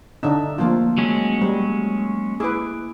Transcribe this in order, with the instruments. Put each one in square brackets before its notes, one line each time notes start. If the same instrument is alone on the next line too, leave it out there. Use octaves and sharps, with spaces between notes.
[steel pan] D3 D4 D#4 [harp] E5
[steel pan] F3 F4 [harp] A3 A#3
[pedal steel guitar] F#3 G#3 C#4
[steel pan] G3
[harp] E4 D6 [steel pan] G#4 B4